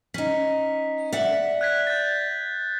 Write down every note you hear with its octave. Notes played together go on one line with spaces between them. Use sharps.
C#4 D#4 B6
D5 E5 F#5
F#6 G#6 B6
G6 A6